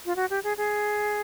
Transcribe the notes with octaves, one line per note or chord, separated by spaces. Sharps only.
F4
F#4
G4
G#4
G#4